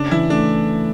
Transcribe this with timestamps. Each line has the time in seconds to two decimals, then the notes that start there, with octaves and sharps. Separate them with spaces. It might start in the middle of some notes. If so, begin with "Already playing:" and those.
Already playing: C#3 D4
0.11 E3 E4
0.30 A3 D4